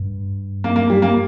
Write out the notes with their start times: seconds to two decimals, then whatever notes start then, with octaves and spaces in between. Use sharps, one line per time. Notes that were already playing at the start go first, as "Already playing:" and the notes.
Already playing: G2
0.64 A#3
0.76 A#3
0.90 G3
1.02 A#3